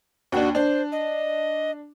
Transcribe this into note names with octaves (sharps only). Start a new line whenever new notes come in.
D#2 D4 F#4
D4 C5
D#5